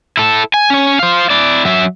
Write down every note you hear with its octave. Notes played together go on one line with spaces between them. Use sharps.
E4 A4
G#5
C#4 C#5
C5 F5
E4 D5
F#3 E5